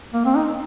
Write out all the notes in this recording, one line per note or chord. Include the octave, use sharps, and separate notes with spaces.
A#3
C4
D#4